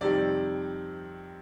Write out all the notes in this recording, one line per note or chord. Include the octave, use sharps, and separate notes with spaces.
F2 C3 D#3 G3 D5